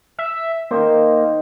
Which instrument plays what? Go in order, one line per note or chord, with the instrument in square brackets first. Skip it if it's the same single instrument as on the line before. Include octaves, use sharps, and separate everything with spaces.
[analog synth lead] E5
[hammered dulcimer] D#3 D#4 C5 [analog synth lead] A#3